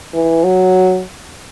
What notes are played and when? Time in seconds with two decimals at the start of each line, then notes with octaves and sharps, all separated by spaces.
0.14 E3
0.44 F#3